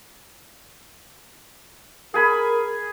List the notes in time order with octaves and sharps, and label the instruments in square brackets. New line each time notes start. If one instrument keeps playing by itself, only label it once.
[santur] G#4 G#5 B5 [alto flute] A#4